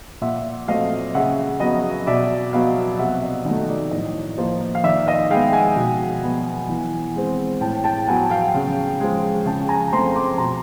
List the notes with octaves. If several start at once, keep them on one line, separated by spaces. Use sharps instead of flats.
A#2 E5 F#5
F#3 A3 C4 D#5 F5
C#3 E5 F#5
F#3 B3 D#5
B2 D5 E5
F#3 B3 D#5 F5
C3 E5 F#5
D#5
D#3 F#3 A3 D#5
D5
A2 D#5
F3 A#3
F5
D#3 D5 E5
D#5 F5
G#3 B3 F5 G5
F#5 G#5
B2
F#3 B3
E3
G#3 C4
A2 G5 A5
G5 A5
F#3 B3 F#5 G#5
F5 G5
C#3
F3 G#3
C#3 G5 A5
G#5 A#5
F3 A3 C4 A#5 C6
C6 D6
B2 A#5 C6